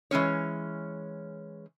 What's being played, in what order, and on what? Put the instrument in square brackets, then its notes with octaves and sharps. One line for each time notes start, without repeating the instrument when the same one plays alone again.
[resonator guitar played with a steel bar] E3 G#3 C#4 C#5